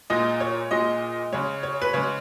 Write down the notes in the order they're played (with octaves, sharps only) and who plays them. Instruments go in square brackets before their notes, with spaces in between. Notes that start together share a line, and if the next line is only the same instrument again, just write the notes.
[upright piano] A#2 G#3 D#5
C#5
A#2 G#3 D#5
C#3 G#3 C#5
C#5
B4
C#3 G#3 C#5